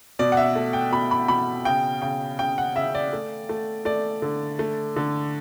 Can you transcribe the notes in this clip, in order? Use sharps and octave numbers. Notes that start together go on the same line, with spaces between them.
B2 D5
F#5
E5
A3
G5
B2 B5
B5
B2 B5
C#3 G5
C#3 G5
C#3 G5
F#5
C#3 E5
D5
A3
A3
A3 D5
D3
A3
D3